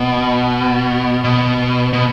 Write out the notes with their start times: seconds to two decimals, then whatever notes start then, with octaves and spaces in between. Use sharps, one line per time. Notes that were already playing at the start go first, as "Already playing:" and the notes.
Already playing: B2
1.24 B2
1.93 B2